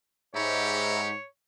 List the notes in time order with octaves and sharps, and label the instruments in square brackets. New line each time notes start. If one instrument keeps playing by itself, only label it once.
[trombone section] G#2 [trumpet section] G4 [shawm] C#5 [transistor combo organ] E5 A#5 B5